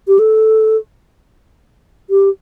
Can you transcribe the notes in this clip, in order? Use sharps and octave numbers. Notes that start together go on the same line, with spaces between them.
G4
A4
G4